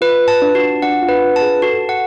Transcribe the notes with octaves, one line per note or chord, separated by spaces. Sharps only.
F4 B4
A5
D4
F#4
D4 F#5
F4
B4
A5
G#4
F#4 A4
F#5